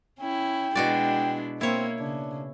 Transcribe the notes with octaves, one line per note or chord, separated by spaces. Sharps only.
C#4 E4 G5
B2 G#3 D4 E4 F#4 D5
A#3 C4 E4 C#5
C#3 D4